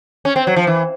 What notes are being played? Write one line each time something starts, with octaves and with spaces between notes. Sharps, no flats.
C#4
C4
F#3
F3
E3